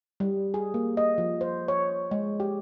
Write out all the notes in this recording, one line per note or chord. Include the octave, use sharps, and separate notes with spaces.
G3
G#4
A#3
D#5
F3
C5
C#5
G#3
G4